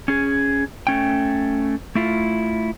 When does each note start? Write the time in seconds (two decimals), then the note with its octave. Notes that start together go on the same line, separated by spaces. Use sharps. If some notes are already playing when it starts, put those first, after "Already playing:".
0.08 C#4 G#4
0.87 A3 C#4 G5
1.95 A3 E4 F4